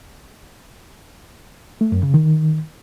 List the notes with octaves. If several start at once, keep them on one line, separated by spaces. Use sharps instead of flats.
A3
F#2
C#3
D#3